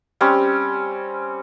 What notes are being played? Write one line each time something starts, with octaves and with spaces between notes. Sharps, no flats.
G3 C4 C#4